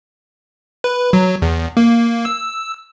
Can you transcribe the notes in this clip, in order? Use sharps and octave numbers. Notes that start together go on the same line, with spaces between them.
B4
F#3
E2
A#3
E6